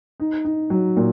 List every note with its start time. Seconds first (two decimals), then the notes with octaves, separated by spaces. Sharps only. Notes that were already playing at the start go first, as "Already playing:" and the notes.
0.20 D#4
0.45 D#4
0.70 F#3
0.97 A#2